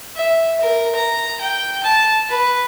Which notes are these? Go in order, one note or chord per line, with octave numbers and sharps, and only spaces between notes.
E5
A#4
A#5
G5
A5
B4